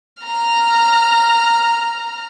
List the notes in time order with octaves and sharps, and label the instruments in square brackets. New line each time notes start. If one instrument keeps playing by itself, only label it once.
[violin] A#5 F6